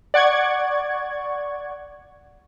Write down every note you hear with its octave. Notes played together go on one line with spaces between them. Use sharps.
D5 F#5 C#6 G#6